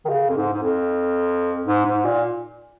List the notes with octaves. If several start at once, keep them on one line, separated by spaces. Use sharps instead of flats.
D#3
C#3
F2
G#2
G#2
F2
G#2
G#2
A#2